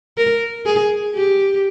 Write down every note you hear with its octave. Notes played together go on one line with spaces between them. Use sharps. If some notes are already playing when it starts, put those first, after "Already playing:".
A#4
G#4
G4